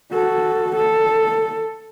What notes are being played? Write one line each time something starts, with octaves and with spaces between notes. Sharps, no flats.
F#4 A4
A4